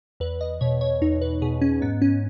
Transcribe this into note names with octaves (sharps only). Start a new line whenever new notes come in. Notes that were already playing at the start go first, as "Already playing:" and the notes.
E2 B4
D#5
B2 C#5
C#5
E2 D#4
B4
B2 G#4
C#4
G#2 B3
C#4